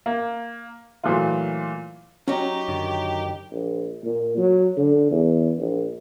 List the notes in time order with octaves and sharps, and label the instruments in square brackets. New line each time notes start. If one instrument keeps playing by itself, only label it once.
[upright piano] A#3
A#2 E3 F#3 A3 F4
[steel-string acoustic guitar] F#3 D#4 [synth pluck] C#4 [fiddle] G4
[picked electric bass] F#2 D3 D#3
[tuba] A#1
A#2
F#3
D3
E2
A#1